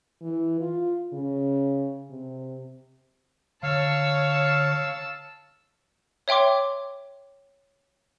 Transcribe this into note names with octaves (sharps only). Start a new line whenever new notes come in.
E3
F4
C#3
C3
D3 C#5 F5 A5 E6
C#5 E5 G5 C6 D6